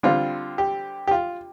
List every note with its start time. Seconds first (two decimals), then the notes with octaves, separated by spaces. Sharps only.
0.03 D3 G3 C4 F4
0.58 G4
1.07 G4
1.11 F4